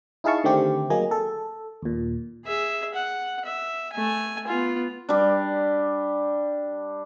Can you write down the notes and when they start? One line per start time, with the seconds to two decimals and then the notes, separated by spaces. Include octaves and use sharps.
0.24 D#4 E4 G#4 F5 A5 C#6
0.44 D3 D#3 A3 C4 G4
0.90 F#3 A#3 G#4 D#5
1.11 A4
1.82 D#2 A#2
2.45 G#4 E5
2.94 F#5
3.45 E5
3.93 A3 G#5
4.48 B3 F4
5.09 G3 D4